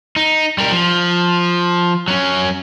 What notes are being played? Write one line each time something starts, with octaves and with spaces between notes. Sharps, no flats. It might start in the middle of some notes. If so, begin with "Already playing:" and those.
D#4
G3 A#4
F3
F#3 C#4